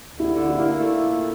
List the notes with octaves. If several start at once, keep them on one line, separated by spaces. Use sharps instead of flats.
D2
E4
D3
E4
A#3
A3
A#2